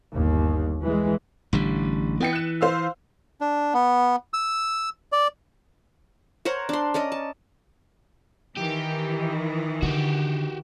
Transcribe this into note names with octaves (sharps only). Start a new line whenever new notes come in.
G1 D#2
E3 G#3
A1 D3 G3
E3 B3 G5 C#7
F#6 E7
C5 F5 E6
D4
B3
E6
D5
A#4 C5 C#5 F#5
D4 C6
C#4 A#4 D5 D#5
A5
D#3 E3 G4
D3 F#4 G4